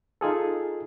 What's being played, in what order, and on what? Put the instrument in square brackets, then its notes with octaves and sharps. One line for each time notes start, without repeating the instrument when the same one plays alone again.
[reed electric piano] D#4 F4 G#4 A4